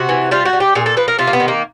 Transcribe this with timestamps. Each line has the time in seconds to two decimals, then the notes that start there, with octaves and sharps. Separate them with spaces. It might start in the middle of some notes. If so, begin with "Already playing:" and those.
Already playing: C3 F#4
0.09 E3
0.31 G3 F4
0.45 F#4
0.53 G3
0.60 G4
0.75 A#2 G#4
0.86 A4
0.97 F3 B4
1.08 A#4
1.19 C3 F4
1.27 A#3
1.33 B3
1.40 D#3
1.48 A#3